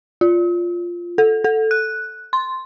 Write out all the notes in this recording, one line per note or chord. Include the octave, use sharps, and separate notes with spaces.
F4
A4
A4
F#6
C6